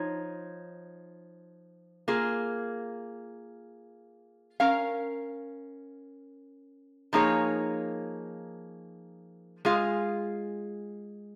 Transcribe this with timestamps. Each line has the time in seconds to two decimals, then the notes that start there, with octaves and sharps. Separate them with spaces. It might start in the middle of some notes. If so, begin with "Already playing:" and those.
Already playing: F3 D#4 C#5
2.08 A#3 F4 G#4
4.60 C#4 A#4 F5
7.13 F3 A#3 D#4 G#4 C#5
9.65 G#3 F4 G#4 F5